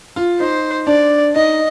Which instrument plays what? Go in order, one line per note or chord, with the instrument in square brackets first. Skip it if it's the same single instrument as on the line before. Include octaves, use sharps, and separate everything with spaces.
[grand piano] F4
[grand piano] D#4 [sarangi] C5
[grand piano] D4 [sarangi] D5
[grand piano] D#4 [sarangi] D#5